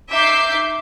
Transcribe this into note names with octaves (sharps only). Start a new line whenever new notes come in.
D#4 E5 D6 G6 C7